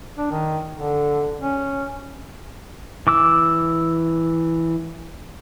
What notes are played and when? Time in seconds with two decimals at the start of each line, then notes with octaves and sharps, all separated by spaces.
0.18 D4
0.31 D#3
0.74 D3
1.39 C#4
3.07 E3 D6 E6